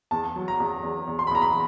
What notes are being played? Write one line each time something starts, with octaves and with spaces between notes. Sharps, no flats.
E2 A5
F#3
A#5
E2
E2
E2
C6
B5
E2 A#5
B5